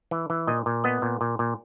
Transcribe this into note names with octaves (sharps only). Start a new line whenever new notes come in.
E3
E3
A#2 D#5
A#2
B3 D#5
A#2
A#2
A#2